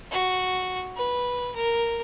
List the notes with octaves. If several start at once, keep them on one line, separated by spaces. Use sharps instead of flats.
F#4
B4
A#4